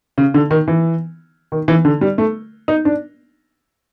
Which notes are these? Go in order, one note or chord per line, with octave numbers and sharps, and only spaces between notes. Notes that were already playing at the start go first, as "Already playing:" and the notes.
C#3
D3
D#3
E3
D#3
E3
D3
G3
A3
D#4
D4